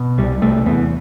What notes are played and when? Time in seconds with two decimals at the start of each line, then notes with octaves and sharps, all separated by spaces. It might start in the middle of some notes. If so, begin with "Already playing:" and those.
Already playing: B2
0.18 C2 G3
0.42 C2 A3
0.66 E2 B3